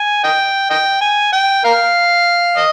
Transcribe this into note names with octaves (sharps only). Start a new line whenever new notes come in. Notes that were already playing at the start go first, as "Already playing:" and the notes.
Already playing: G#5
D#5 G5
D#5 G5
G#5
G5
A#4 F5
D#5